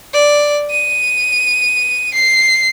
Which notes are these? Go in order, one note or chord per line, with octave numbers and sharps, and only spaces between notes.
D5
D#7
C7